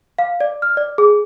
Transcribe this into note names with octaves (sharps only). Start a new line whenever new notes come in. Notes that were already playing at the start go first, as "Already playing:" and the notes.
F5
D5
F6
D5
G#4